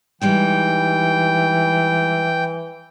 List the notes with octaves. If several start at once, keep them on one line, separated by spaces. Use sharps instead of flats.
E3 G3 G#3 D#4 G5